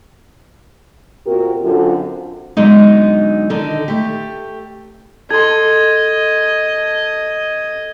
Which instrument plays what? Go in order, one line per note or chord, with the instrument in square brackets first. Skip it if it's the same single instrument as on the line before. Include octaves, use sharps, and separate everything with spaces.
[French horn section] A#2 C4 F#4 G4 A#4
F#2 D3 C4 F4 F#4 A4
[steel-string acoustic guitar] D3 F#3 G#3 B3 D#4
D3 D#3 D#4 A4
A3 G4
[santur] A4 C6 [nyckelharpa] D#5 [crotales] G#6